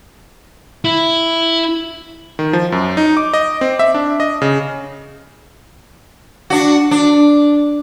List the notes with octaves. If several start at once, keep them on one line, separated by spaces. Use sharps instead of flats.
E4
D#3
F3
F#2
D#4
D6
D#5
C4
E5
D4
D#5
C#3
D4 F#4
D4